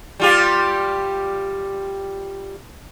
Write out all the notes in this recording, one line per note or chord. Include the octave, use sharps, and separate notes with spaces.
G3 F4 G4